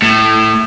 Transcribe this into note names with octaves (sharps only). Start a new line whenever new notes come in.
A2